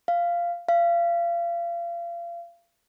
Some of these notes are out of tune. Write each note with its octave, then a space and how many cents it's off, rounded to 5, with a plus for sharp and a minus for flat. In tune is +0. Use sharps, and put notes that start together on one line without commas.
F5 -10
F5 -30